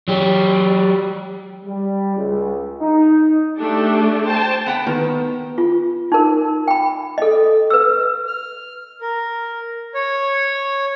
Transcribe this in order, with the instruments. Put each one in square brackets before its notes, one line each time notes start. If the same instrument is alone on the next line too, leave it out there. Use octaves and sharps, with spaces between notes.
[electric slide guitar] F#3 G4
[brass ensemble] G3
C#2
D#4
[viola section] A3 D4 G4 A4
C5 G5 A5
[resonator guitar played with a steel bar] B3 F#5 G5
[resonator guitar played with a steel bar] D#3 [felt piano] B3
[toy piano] F4
D#4 A#4
G5 B5
A4 D#5
B4 E6
[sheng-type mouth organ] F6
A#4
C#5